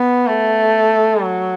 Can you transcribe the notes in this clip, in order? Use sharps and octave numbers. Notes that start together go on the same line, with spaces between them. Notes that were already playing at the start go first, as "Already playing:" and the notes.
Already playing: B3
A3
F#3